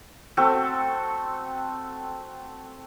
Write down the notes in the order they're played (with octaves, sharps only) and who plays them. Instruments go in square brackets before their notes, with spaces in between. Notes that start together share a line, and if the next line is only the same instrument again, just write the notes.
[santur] A3 C4 F#4 A4